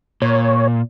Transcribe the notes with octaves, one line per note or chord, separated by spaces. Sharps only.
A#2 C#5